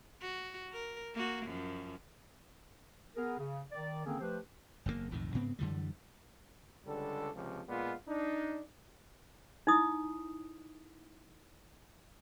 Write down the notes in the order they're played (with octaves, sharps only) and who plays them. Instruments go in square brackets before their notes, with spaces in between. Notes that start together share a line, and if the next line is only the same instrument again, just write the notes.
[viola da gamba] F#4
A#4
A#3 F#4
F#2 F3
[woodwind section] B3 G#4 A#4
C#3
D#3 D5
D3 D#3 A#3 C4 C#4 G#4
F3 A3 G4 B4 C5
[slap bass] F#1 E2 G2 A#3
B1 F2 A2 D#3
G#2 C#3 B3 C4
F#2 D3 E3 G3
[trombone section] C#2 D3 G3 A4
C#2 C3 F3
A#2 G#3 B3 F4
D4 D#4
[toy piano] D#4 E4 D#6